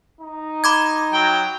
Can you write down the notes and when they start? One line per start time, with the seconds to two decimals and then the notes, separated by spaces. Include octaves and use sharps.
0.21 D#4
0.64 B5 D6 G#6
1.13 F#3 G5